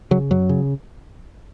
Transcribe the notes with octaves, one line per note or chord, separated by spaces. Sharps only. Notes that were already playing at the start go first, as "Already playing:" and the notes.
C#3 F#3
F#2 F#3
C#3